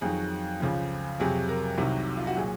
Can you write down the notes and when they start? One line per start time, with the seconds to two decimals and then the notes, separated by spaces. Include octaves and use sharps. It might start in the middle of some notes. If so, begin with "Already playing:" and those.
0.01 F2 D#3 F#3 G#4
0.60 C#2 C#3 F3
1.20 F2 C3 F#3 G#4
1.49 A#4
1.78 C2 C3 D#3 F#3
2.17 F4
2.27 F#4
2.37 A#2 F#3 G#4